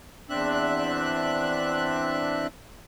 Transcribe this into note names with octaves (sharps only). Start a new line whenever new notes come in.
E2 C4 D4 E5 F#6